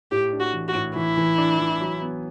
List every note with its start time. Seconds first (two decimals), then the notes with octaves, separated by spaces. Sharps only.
0.11 A2 G4
0.33 D4
0.40 F#4
0.54 E3
0.68 F#4
0.75 A2
0.96 E3 E4
1.17 E3
1.38 D4
1.59 E3
1.81 F#3
2.02 B3